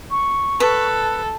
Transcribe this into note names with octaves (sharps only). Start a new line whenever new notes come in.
C#6
A4 B4